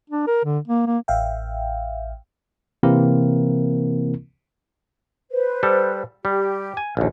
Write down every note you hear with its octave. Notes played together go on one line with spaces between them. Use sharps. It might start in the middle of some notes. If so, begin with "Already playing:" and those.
D4
A#4
D3
A#3
A#3
A1 E5 F5 G5
C3 E3 A#3 C4 E4 A#4
B4 C5
G3 G4 A4
G3 G4
G#5
A#1 D#2